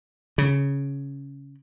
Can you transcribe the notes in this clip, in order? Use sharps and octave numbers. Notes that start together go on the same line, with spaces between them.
C#3